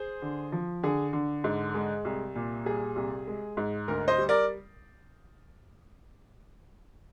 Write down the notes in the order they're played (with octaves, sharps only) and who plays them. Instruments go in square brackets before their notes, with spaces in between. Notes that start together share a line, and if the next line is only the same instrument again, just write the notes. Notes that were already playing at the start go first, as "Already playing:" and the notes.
Already playing: [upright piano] G#4 C5
D3
F3
D3 G#4
D3
G#2
G#3
C2
A#2
G3 G#4
C2
G#3
G#2
D2 A#4
C5 D#5
G3
A#4 D5